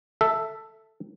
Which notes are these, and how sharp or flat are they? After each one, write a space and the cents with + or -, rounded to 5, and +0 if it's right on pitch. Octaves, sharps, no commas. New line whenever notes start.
A4 +5 E5 +0